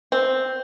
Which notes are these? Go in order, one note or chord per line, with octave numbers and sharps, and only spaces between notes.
C4